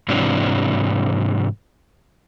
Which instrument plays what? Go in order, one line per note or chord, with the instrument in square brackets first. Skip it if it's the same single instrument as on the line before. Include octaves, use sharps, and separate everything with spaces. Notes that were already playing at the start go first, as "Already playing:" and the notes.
[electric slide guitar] G#2 C3 E3 F#3 D4